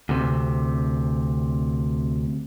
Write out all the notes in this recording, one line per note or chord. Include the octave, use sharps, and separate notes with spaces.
D2 C3